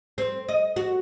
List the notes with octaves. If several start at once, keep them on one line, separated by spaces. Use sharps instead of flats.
C4
D#5
F#4